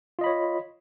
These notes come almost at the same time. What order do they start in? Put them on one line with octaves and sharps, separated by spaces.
F4 D#5 B5 C#5